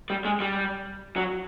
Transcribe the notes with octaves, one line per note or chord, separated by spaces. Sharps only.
G3
G#3
G3
F#3